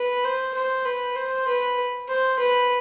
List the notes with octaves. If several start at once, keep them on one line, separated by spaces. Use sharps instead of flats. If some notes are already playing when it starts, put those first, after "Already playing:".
Already playing: B4
C5
C5
B4
C5
B4
C5
B4